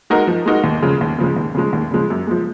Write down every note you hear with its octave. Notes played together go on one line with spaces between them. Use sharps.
G#3 D#4 F#4 A#4
F3
G#3 D#4 F#4 A#4
D#2
C#3 F3 G#3
D#2
C#3 F3 G#3
D#2
C#3 F3 G#3
D#2
C#3 F3 G#3
F#2
F3 G#3